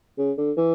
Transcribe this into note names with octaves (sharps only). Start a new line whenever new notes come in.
C#3
D3
E3